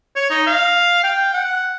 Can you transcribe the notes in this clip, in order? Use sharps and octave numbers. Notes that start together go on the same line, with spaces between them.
C#5
D#4
F5
G5
F#5